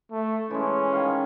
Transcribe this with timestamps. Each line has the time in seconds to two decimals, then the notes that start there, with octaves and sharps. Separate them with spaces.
0.12 A3
0.50 E3 G#3 C#4
0.93 D#3 F5